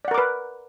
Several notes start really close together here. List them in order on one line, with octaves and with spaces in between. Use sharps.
D5 F#5 A#4 D6 B4